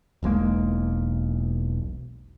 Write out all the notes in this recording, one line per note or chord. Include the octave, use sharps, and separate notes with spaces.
E1 B1 G#3 A#3